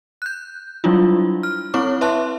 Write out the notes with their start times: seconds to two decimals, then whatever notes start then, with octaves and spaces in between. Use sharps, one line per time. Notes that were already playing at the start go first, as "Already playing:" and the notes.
0.22 F#6 G6
0.84 F#3 G3 D4 E4 F4
1.43 F6
1.74 C4 E4 C#5 C#6 D6
2.01 B4 E5 A5 C6 F#6